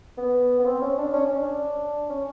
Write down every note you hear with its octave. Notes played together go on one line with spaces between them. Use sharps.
B3
B3
C4
C#4
D4
C#4
C#4
D4
C#4